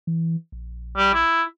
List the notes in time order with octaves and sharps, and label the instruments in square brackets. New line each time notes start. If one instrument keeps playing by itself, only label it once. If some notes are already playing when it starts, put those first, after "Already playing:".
[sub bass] E3
A#1
[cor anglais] G3
E4